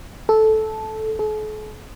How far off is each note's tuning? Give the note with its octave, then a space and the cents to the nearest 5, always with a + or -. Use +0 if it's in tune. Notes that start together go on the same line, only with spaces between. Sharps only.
A4 -10
A4 -45